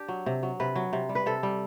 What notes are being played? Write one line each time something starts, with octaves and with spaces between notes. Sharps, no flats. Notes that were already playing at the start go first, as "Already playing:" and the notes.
Already playing: D4 G4
F#3
C3
F#3
C3 B4
F#3
C3
G3
B4
C3 A4
G3